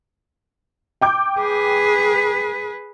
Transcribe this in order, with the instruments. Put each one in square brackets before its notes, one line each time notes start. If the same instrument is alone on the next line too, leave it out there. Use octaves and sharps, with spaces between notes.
[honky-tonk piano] G5 D6 G6
[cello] G#4 B4